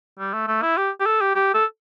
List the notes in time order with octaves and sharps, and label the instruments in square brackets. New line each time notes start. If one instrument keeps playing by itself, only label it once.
[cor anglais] G3
A3
A3
E4
G4
G4
A4
G4
G4
A4